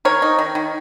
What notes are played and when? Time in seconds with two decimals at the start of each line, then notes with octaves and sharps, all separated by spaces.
0.05 D#3 A#4 C#5
0.22 D#4
0.39 D#3
0.55 D#3